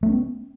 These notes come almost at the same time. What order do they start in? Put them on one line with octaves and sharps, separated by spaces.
A3 D4 C#4 B3